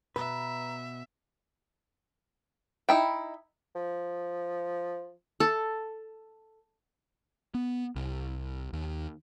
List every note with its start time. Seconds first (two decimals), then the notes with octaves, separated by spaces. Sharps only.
0.16 B2 B4 E5 A#5
2.89 D#4 E4 G5
3.76 F3
5.40 A4
7.54 B3
7.96 C2
8.73 D#2